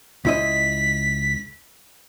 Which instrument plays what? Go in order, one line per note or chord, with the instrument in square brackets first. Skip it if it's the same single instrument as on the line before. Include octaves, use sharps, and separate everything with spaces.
[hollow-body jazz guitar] C#2 E4 D#5 [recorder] B6